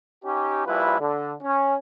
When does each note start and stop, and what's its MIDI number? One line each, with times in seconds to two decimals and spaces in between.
0.25 0.64 61
0.25 0.64 63
0.25 0.64 67
0.66 0.98 34
0.66 0.98 55
0.66 0.98 64
0.66 0.98 65
0.66 0.98 71
1.00 1.33 50
1.42 1.75 61